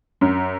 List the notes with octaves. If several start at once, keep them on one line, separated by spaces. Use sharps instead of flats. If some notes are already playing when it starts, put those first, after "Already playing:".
F#2